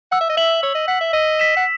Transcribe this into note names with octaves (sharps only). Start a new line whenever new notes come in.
F#5 E6
E5
D#5
E5 B6 F#7
C#5 E6
D#5
F#5 B6 F#7
E5
D#5 E6
B6 E7
F#5